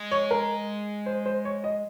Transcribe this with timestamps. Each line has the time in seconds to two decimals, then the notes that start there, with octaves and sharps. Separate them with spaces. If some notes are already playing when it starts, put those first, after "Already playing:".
Already playing: G#3
0.11 C#5
0.31 A#4
1.06 C5
1.26 C5
1.45 C#5
1.64 D#5